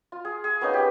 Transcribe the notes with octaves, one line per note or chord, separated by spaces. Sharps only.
F4
G#4
G#4
A#3 B3 C#4 D#4
G4 B4